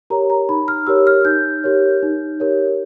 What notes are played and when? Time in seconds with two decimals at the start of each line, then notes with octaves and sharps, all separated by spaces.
0.10 G4 A#4 C#5 A#5
0.30 A#5
0.49 D#4 B5
0.68 F6
0.87 G4 A#4 C#5 E6
1.07 F6
1.25 D#4 G6
1.64 G4 A#4 C#5
2.03 D#4
2.40 G4 A#4 C#5